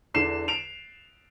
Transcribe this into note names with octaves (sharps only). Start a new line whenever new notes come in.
E2 D3 C7 E7
D7 F7